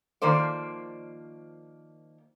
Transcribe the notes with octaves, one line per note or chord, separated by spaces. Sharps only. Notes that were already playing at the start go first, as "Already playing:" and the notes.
D#3 F3 A#3 C5 D5